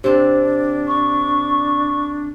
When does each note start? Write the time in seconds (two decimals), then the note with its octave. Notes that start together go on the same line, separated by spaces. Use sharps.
0.04 C3 C4 D4
0.87 C#6